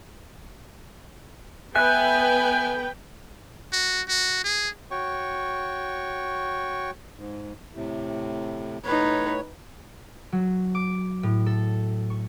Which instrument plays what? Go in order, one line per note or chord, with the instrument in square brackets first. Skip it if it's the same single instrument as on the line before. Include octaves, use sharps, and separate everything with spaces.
[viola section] B3 B4 G5 [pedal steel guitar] A4 E5 F#6 [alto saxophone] G#5
[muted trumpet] F#4
F#4
G#4
[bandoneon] F#4 C#5 G5 C#6
[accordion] G#2
A2 C3
[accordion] A2 C#5 [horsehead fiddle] D#4 B4
[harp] F#3
D6
A2
A4
C#6